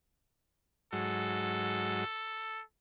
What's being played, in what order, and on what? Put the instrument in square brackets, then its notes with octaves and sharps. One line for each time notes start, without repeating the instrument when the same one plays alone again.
[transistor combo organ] G#2 F#3 [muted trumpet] A4